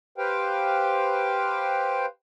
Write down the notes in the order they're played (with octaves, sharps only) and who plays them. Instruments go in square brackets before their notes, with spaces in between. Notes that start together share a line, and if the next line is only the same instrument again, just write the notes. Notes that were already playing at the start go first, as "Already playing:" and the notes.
[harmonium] G4 B4 C5 F5 G5